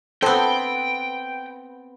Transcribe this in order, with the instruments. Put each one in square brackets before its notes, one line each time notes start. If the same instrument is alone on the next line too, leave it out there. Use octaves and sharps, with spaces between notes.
[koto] B3 C4 [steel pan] A4 C5 [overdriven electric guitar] G5